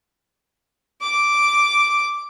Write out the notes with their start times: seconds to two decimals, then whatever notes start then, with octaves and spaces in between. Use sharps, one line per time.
1.02 D6